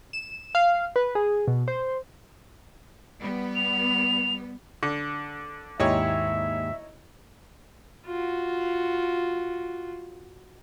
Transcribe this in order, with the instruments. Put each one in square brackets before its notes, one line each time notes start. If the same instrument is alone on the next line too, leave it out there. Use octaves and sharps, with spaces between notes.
[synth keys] E7
F5
B4
G#4
B2
C5
[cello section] G3 B3
[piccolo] F7
[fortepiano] D3
[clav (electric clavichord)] D#2 G#2 G4 [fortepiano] D#4 E4 C#5 [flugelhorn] E5
[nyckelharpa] F4 F#4